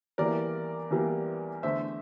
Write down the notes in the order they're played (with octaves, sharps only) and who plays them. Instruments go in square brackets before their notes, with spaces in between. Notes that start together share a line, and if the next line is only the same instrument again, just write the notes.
[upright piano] E2 E3 G3 A#3 A#4 D5
E2 E3 G3 A#3
E2 D3 A3 C5 E5